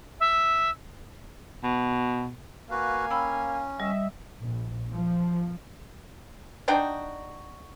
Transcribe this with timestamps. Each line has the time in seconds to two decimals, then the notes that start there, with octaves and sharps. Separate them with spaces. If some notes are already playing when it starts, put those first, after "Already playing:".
0.19 E5
1.63 B2
2.71 A#3 F#4 B4 F5 G#5
3.11 C#4 G5 B5 E6
3.80 G3 D#5 E5
4.40 A#1
4.92 F3
6.68 D4 D#4 F#4 G5